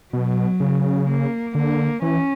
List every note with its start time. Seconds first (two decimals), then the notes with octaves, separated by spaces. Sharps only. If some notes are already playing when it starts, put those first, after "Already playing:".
0.13 B2 F#3
0.60 C#3
1.08 A#3
1.55 D3 A#3
2.02 E3 C#4